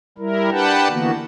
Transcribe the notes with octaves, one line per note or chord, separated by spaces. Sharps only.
G3 E4 A#4
D4 G4 B4 F#5 G5 A5
D3 E3 A#3 B3 F#4